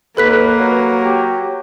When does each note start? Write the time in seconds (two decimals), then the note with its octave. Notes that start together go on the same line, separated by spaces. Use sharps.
0.17 D#2 A#3 A4 B4 F#6 B6
0.59 F#3
1.02 G4